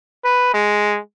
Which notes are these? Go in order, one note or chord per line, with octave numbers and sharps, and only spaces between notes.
B4
G#3